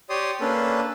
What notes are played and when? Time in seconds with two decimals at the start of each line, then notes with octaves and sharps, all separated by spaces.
0.10 G4 C#5 D5 C6 D#6
0.41 A#3 C#4 D4 A4 B4